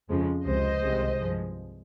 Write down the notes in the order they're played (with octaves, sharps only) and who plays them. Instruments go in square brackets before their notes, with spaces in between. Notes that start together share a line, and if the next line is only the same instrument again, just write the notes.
[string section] F2 C#3 F3 G#3
C#2 C3 F3 C5 D#5
C2 C3 D#3 G#3
G2 F3 G#3